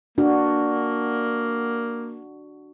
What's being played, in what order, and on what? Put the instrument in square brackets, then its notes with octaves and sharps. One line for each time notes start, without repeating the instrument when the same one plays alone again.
[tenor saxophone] A#3 [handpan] D4 F#4